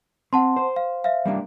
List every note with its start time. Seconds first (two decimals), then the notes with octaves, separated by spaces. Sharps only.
0.33 C4 F#5 A5 C6
0.56 C5
0.76 F5
1.04 E5 F5
1.26 G3 A#3 D4